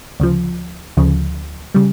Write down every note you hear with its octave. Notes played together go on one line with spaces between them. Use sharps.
D2 C#3 F3
D2 C#3 F3
C#3 G3